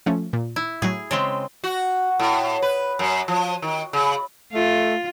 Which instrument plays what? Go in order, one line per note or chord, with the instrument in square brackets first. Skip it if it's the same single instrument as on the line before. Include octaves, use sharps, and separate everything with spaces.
[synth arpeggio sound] F3 A3 C#4
A#2
[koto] E4
[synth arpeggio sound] A2 F#3 [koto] G#4
[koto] C#3 G#3 C4
[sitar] F#4
A2
B4
F#2
F3
D#3
C#3
[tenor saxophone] A3 [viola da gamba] F4